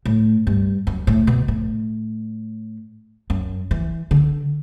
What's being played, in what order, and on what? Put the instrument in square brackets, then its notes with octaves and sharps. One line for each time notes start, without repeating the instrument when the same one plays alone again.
[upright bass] A2
G2
F#2
A2
B2
A2
F#2
E3
D3